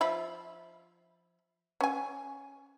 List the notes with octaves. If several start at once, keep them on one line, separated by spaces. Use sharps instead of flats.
F3 E5 B5
C#4 G#5